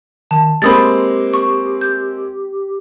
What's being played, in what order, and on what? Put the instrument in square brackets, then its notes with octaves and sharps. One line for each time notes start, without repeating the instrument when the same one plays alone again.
[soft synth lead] D#3 [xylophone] A5
[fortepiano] G#3 A#3 C4 [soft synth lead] G4 [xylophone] B5 D#6 A6
[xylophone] C#6
G6